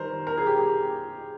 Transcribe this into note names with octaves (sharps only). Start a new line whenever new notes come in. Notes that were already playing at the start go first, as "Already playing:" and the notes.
Already playing: D#3 G3 A#4 C5
A#4
G#4
G4
G4